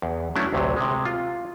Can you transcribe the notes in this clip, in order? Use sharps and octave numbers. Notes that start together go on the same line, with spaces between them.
E2
F#3 A3 C#4 D4 E4
A1 D2 C3 F#3
C3 G#3
F4